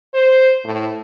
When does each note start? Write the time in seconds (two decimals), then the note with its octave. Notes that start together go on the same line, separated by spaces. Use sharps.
0.14 C5
0.65 A2